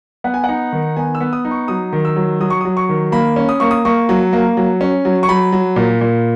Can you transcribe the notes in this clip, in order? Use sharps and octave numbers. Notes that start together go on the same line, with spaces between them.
B3 F#5
G#5
F#5
D#4
D#3
B3 G#5
E6
B3
D#6
D#4
C#6
F#3 D#6
D#3
E6
F#3
F#3 D#6
C#6
F#3 D#6
C#6
D#3
A#3 B5
C#4
D#6
A#3 C#6
D#6
A#3 C#6
F#3
A#3
F#3
C#4
F#3
C#6
F#3 B5
F#3
A#2
A#2